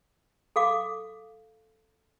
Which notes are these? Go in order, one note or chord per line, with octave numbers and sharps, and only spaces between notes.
A4 F5 D6